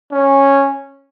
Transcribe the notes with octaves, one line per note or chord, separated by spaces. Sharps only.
C#4